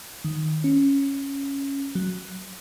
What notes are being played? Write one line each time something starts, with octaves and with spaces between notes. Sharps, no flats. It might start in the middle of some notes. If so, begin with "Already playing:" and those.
D#3
C#4
F#3